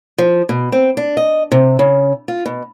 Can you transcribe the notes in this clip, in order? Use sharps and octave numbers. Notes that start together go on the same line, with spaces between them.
F3
B2
C4
D4
D#5
C3
C#3
F4
B2